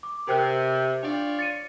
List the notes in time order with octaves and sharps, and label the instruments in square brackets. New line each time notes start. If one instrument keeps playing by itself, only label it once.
[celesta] D6
[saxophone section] C3 [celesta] A#4 G5 F#6
[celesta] D4 [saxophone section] F4 C#5 D5
[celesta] A6 C#7 D#7